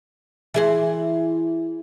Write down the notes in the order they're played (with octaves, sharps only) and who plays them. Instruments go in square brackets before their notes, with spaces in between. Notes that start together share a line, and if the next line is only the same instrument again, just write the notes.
[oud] E3 G#4 C5